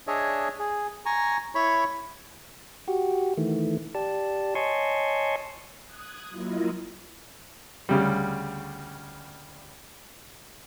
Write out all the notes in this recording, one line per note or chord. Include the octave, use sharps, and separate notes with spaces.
D4 G#4 C#5 D#5 E5
G#4
G#5 A#5 C#6
E4 C#5 B5 C#6
F#4 G4
D#3 E3 A3
G4 D5 A5
C#5 D#5 G#5 A5 C6 C#6
D#6 F#6 G#6
F#3 A#3 E4 F4 D#5
D2 C#3 G3